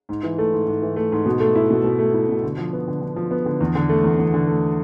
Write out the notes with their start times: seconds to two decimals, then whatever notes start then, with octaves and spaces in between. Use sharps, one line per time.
0.09 G#2
0.23 E3
0.38 A3
0.53 G#2
0.67 G#2
0.82 E3
0.96 A3
1.12 G#2
1.26 B2
1.40 A3
1.55 E4
1.70 B2
1.84 B2
1.99 A3
2.14 E4
2.29 B2
2.43 D3
2.58 F3
2.73 B3
2.88 D3
3.01 D3
3.16 F3
3.31 B3
3.46 D3
3.61 E2
3.75 D3
3.89 A3
4.04 E2
4.19 E2
4.34 D3
4.48 A3